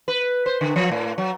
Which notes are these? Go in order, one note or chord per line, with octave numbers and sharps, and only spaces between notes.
B4
C5
D3
F3
A2
F#3